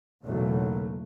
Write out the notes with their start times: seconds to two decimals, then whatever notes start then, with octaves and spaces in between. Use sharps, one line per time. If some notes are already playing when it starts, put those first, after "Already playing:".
0.24 B1 E2 C#3 F#3 A3 A#3